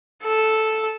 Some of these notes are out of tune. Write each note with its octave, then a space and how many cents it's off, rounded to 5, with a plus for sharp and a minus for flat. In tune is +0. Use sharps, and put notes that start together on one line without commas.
A4 -5